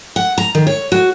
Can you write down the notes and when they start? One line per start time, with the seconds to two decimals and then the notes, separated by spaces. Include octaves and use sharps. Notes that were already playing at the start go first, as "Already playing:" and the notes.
0.16 F#5
0.38 A#5
0.55 D#3
0.67 C#5
0.92 F#4